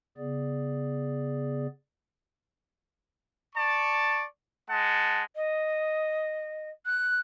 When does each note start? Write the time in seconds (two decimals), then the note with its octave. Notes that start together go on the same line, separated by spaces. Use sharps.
0.17 C#3 B3 G#4 D5
3.56 D5 A5 C#6
4.70 G#3 F#5 A5
5.35 D#5
6.86 F#6